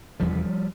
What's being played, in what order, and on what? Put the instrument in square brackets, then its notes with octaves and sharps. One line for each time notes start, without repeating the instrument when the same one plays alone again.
[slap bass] F#1 E2 C3 F3 G3